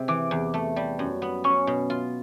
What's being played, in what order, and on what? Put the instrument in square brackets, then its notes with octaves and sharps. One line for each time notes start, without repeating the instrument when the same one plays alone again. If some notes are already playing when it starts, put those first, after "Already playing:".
Already playing: [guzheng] C3 G#3
[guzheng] E3 [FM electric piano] D6
[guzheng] E2
A3
G3
F#2
B3
[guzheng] C#4 [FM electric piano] C#6
[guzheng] B2
F4